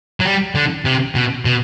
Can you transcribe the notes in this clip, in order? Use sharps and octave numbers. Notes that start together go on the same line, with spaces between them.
F#3
G3
D3
C3
B2
B2